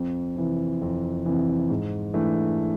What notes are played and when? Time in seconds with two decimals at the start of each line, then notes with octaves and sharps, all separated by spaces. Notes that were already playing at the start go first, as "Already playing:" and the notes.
Already playing: F2
0.36 C3 E3
0.82 F2
1.25 C3 E3
1.70 G#2
2.14 E3 A3 D4